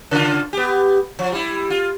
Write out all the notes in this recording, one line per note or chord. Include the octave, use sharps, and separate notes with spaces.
C#3 F4
B3 G4
F3
G3 E4
F4